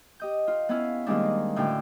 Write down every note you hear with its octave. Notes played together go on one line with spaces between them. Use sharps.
G4 D#5 G6
F4
B3 C#4 E4 F5
D#2 D#3 G3 G#3 C4 D4
A2 D3 C#4 F#4 A4 G5